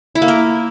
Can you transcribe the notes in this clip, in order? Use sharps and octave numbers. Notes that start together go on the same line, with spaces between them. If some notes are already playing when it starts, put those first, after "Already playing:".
E4
A#3
A#4